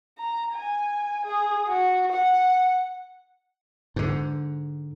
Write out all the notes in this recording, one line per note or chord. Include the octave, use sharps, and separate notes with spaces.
A#5
G#5
G#4
F#4
F#5
G#2 D3